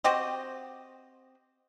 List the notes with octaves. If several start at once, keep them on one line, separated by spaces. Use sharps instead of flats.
C4 F#4 G4 D#5